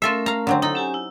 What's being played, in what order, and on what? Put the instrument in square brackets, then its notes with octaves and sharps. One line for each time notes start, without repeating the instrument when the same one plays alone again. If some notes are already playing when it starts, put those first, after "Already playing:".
[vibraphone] A3 C#4 A#4 [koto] F4 A4 E5
[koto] F5 A#5
D3 F#3 C4
[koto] D#4 [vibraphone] E4 A4 F#5
[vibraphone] C#4 G4 G#5
E4